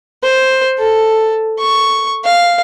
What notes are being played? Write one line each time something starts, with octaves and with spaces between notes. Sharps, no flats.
C5
A4
C#6
F5